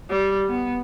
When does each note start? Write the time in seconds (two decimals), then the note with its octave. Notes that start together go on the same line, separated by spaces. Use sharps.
0.10 G3
0.49 B3